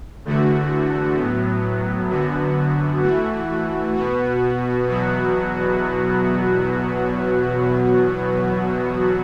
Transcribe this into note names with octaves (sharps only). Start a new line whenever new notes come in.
E2 D3 A3 F#4
A2 F#3 B3
F#2 D3 B3 F#4
E3 A3 F#4
B2 B3 F#4
E2 B2 F#3 B3 F#4